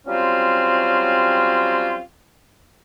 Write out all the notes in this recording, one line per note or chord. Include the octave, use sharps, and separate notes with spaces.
F#3 G3 C4 C#4 F4